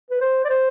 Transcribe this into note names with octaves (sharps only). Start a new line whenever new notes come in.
B4
C5
D5
C5